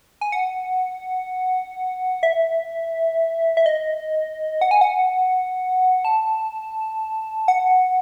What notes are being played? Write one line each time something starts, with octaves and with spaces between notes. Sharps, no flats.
G#5
F#5
E5
E5
D#5
F#5
G#5
F#5
A5
F#5